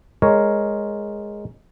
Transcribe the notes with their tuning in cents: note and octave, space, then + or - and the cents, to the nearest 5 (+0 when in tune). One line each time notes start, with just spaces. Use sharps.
G#3 +0 A#4 +0 C#5 +0